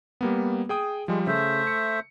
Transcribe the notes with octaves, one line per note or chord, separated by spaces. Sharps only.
G3 A#3 B3
G#4 G5 D#6
F3 G3 G#3
C#3 A3 C5 E5
C#7